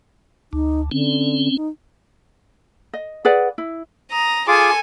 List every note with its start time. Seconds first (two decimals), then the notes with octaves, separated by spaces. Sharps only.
0.53 D2 D#4
0.91 D3 C4 C#4
1.57 D#4
2.93 D#5
3.25 G#4 B4 D5 F#5
3.58 E4
4.10 A#5 D#6
4.48 F4 G#4 A4 G#5 D6